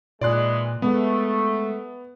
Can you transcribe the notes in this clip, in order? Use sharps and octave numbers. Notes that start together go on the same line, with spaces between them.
A#2 D#3 E3 G#3 D5 C6 F#6
G#3 A3 B3